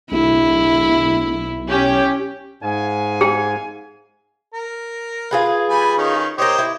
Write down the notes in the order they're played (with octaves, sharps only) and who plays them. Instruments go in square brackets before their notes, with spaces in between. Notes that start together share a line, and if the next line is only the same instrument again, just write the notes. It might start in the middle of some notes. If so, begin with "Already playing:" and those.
[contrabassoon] D1 [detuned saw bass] B1 [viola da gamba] E4
[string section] C#4 G4
[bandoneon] G#2 [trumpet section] F5 G#5
[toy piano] G#4
[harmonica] A#4
[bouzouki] F4 G#4 B4
[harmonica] G3 G#5 B5
D#3 C#4 D#4
[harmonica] G4 C5 D#5 [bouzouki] A#4 C#5
[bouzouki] E4